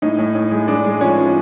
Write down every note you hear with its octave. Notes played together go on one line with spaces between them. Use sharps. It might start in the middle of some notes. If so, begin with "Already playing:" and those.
A2 D#4
A2
A2
G#3
G#3 D4
G#3
F3 C#4
F3